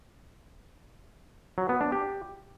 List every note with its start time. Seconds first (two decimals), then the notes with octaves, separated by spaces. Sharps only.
1.58 F#3
1.69 B3
1.81 D4
1.92 G4